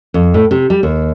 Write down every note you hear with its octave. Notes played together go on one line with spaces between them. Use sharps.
F2
A2
C3
G3
D#2